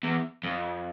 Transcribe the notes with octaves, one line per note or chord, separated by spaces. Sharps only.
E2
F2